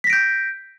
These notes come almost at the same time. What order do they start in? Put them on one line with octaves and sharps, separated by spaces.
B6 A#6 D7 G6